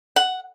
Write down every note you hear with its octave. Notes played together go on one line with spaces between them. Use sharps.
F#5